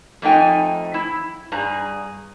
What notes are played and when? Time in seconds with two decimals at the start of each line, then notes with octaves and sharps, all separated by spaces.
0.22 F2 A3 D#4 G5 G#5
0.94 E4
1.52 G2 G#4 A#5